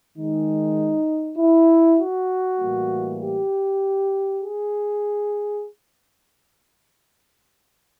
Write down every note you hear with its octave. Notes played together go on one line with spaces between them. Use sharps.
D#3 G#3 D#4
E4
F#4
A2 E3 G3 A#3
G4
G#4